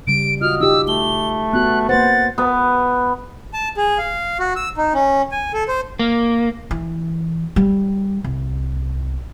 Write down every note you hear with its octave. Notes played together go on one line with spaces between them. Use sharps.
C#3 G3 D7
F4 F#4 D#5 F6
D#4 F4 G4 E6
A3 G7
B3 F#4 F#6
A#3 B4 C5 F#5 A6
B3
A5
G#4
F5
F#4
E6
D#4
C#4
G#5
A4
C5
A#3
E3
G3
C2